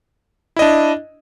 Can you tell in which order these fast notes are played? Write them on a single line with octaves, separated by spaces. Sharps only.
E4 D#5 D4